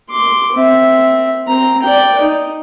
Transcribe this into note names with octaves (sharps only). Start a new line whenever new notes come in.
C6 D6
C4 E5
C4 A#5
D5 G5
D#4